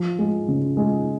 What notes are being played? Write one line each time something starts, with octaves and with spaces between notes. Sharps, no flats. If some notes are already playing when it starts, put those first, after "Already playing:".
Already playing: F3
G#3
C#3
G#3